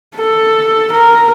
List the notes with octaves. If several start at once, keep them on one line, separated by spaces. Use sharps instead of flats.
A4
A#4